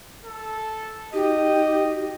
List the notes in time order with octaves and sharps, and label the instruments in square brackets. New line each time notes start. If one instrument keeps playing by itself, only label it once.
[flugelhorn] A4
[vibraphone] D#4 F#4 [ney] G4 [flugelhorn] D#5